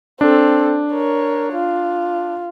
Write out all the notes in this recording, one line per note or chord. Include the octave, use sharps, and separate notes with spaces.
C4 D4 A4
A#4 C#5
F4